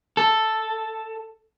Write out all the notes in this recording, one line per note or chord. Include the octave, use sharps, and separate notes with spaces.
A4